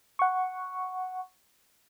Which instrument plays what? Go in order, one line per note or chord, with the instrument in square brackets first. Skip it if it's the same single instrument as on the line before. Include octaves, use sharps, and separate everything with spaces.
[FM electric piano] F#5 C#6